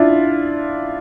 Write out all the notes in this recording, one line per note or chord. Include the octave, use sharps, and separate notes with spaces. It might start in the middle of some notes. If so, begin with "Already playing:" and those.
Already playing: D4 E4 F4